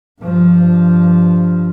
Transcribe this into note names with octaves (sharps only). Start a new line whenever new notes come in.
G2 F3